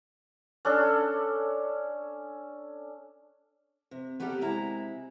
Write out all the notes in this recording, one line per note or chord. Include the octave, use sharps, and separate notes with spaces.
C#4 D4 A4
C3
B3 G4 A4 A#4 D5 F#5
C3 G#3 E4 A#5